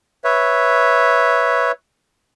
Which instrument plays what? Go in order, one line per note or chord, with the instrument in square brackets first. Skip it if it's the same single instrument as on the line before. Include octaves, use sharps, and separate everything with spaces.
[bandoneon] B4 C#5 E5